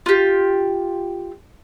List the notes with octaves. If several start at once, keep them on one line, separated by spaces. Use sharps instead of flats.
F4 G4